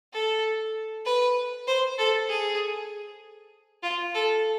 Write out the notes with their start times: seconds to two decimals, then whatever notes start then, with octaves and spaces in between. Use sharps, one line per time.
0.13 A4
1.05 B4
1.67 C5
1.98 A4
2.29 G#4
3.83 F4
4.14 A4